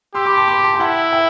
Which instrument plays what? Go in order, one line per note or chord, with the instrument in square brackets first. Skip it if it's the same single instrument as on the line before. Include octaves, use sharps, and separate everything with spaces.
[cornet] G4 [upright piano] C6 E6
[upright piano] B5 D6
A5 C6
B5 D6
A5 C6
G5
[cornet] E4 [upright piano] F#5 A5
[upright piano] E5 G5